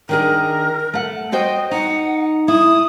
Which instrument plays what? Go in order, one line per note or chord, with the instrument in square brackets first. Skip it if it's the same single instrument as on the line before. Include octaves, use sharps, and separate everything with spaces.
[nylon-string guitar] D#3 D4 G#4 [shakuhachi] A#4
[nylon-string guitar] A3 F#5
[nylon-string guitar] F#4 C5 G5 [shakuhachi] D#5
[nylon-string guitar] D#4 [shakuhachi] F#5
[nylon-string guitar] E4 [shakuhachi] D#6